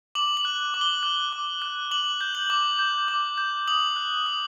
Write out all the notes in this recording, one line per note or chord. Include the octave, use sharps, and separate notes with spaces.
D6 F#7
F#7
F#6
D6
G7
F#6
D6
F#6
D6 F#7
G6
F#7
D6
G6
D6
G6
D#6 F#7
F#6
D#6